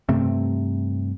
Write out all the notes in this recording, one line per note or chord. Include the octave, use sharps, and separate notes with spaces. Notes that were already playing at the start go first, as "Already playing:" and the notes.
G2 C3 A3 C4